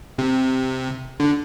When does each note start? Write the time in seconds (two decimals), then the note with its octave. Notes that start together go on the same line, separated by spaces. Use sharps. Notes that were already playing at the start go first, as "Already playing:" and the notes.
0.18 C3
1.20 D3